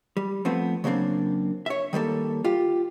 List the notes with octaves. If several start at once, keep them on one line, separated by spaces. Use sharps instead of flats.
G3
F3 A3 B3 C4
C#3 F#3 A#3 C4 D4
C#5 E5
D#3 G3 A#3 A4
F4 G4